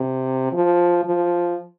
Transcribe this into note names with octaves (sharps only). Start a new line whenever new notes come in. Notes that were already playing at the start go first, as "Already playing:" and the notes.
Already playing: C3
F3
F3